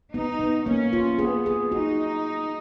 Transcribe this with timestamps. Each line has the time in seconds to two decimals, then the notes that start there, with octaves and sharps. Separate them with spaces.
0.13 B3 D#4
0.39 B3
0.66 A#3 C#4
0.93 F4
1.19 B3 G#4
1.46 G#4
1.72 D#4 F#4